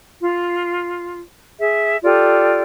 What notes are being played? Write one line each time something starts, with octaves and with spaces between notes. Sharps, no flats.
F4
G#4 E5
F4 G4 A4 D5